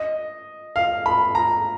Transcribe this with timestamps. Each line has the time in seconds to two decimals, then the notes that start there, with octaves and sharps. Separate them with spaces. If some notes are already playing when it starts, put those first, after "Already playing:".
Already playing: D#5
0.76 F5
1.06 B5
1.35 A#5